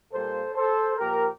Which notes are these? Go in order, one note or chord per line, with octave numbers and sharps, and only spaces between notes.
A#2 G3 A#3 A4 C5
A4 C5
A#2 F3 A#3 G4 A#4